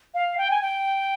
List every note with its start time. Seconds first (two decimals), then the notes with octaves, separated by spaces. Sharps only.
0.14 F5
0.38 G5
0.51 G#5
0.62 G5